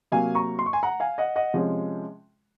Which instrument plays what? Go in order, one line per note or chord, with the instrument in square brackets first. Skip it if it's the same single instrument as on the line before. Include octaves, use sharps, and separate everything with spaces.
[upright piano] C3 F#3 A#3 F5 G#5
A#5 C#6
C6
C#6
G#5 C6
F#5 A#5
F5 G#5
D#5 F#5
D#5 F#5
C3 F3 G#3 C#4